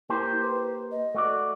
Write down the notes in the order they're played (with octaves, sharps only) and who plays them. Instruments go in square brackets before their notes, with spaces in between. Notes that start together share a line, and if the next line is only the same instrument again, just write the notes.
[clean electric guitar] A#3 G4 C5 [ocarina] E4
[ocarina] B4
D#5
[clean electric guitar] A3 F#4 D5